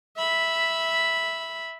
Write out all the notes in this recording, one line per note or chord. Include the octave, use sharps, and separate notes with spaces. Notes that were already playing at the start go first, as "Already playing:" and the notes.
E5 B5